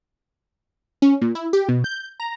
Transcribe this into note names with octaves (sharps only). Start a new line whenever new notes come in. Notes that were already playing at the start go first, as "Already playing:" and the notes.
C#4
A#2
E4
G4
B2
G6
A#5